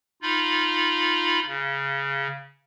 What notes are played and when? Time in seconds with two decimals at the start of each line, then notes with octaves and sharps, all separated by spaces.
0.22 D#4 F4 B5
1.47 C#3